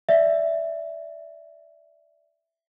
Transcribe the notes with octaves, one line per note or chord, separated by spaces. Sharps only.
D5 E5